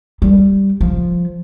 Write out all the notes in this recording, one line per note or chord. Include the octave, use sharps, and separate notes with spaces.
G3
F3